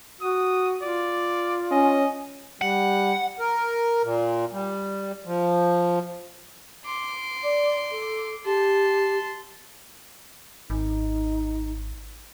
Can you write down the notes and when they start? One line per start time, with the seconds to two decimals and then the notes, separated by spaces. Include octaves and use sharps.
0.21 F#4 D#6
0.82 F4 D5
1.71 C#4 D#5
2.61 G3 F#5
3.40 A#4
4.03 A#2
4.52 G3
5.26 F3
6.85 C6 D6
7.43 D5
7.91 A4
8.45 G4 A5 C6
10.70 G#1 D#4